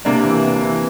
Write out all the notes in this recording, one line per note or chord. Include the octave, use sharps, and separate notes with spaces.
C3 A#3 D4
E3
C3
E3